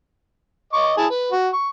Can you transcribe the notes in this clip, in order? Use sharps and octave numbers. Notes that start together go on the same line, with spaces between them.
D#5 C#6 D6
E4 G#4 A5
B4
F#4
C#6